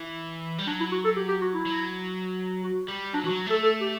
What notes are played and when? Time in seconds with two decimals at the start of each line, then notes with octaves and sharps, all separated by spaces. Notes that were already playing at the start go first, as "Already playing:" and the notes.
Already playing: E3
0.59 G3
0.67 F#3 D4
0.80 E4
0.91 F#4
1.04 A4
1.16 G4
1.28 G4
1.41 F#4
1.54 E4
1.66 F#3
2.63 F#4
2.88 G3
3.13 F#3 D4
3.24 E3 F#4
3.30 F#3
3.46 A3 A4
3.62 A4
3.80 G4